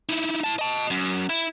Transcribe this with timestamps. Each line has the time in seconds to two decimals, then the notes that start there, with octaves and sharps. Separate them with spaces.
0.09 D#4 E4
0.44 E4 A5
0.59 D#5 A5
0.90 F#2
1.29 E4